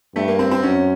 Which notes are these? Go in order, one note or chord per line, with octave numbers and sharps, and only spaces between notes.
G2 A3
A#3
C4
C4
F#2 C#4